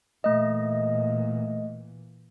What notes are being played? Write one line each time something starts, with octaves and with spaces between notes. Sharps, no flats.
A#2 E3 A3 D#5